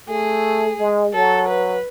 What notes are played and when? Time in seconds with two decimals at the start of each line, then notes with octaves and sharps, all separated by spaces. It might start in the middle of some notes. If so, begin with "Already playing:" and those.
0.09 A3 G#4
0.79 G#3
1.13 F#3 A4
1.48 B4